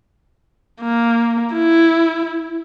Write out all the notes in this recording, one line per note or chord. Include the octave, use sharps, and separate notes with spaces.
A#3
E4